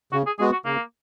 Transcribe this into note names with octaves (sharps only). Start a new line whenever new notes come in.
C#3 F#4
G#4
G#3 B3 F#4 G#4
F#4
C#3 A#3